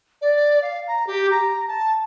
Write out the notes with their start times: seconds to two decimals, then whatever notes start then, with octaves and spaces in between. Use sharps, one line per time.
0.22 D5
0.62 F5
0.88 A#5
1.07 G4
1.31 A#5
1.68 A5